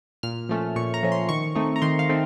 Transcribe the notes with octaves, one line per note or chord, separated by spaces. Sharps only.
A#2 F6
F3 A3 C#4
A#2 C#6
A#5
F3 A3 C#4
C6
D#3 C#6
A3 C4 D#4
A#5
D#3 C6
F5
A3 C4 D#4